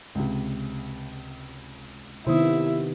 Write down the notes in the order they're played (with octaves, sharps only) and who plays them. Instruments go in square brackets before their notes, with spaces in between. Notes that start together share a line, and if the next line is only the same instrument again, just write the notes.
[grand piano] C#2 C3
[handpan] C3 D#3 B3 [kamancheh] E4 [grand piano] C5 D#6